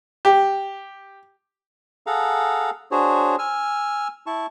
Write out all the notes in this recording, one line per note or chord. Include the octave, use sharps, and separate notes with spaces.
G4
G#4 A4 F5 F#5 A#5
D4 F#4 G#4 C5 C#5
G#5 E6 F6
E4 A5 C#6